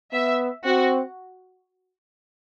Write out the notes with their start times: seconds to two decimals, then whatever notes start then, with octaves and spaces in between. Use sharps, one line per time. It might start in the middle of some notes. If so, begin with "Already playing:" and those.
0.13 B3 E5
0.65 C4 F#4